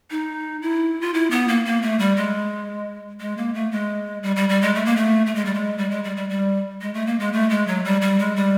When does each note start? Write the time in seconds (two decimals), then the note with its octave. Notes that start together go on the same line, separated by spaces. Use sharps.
0.10 D#4
0.62 E4
1.01 F4
1.14 E4
1.31 B3
1.48 A#3
1.65 A#3
1.82 A3
1.99 G3
2.16 G#3
3.20 G#3
3.37 A#3
3.54 A3
3.72 G#3
4.23 G3
4.36 G3
4.49 G3
4.62 G#3
4.75 A3
4.85 A#3
4.97 A3
5.26 A3
5.35 G#3
5.45 G3
5.54 G#3
5.78 G3
5.91 G#3
6.04 G3
6.17 G3
6.30 G3
6.81 G#3
6.94 A3
7.07 A#3
7.20 G#3
7.33 A3
7.50 G#3
7.67 F#3
7.85 G3
8.01 G3
8.19 G#3
8.36 G3